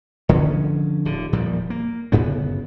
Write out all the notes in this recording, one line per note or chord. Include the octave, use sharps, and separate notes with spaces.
D3 F3 C#4
D1 D3
E1 A#2 F3 G3
A#3
G1 F#2 C#3 B3